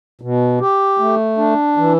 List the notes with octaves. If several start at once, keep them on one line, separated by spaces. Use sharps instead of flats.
B2
G4
A3
D4
E3